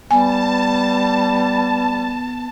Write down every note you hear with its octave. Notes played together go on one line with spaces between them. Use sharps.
G3 B3 G#5 A5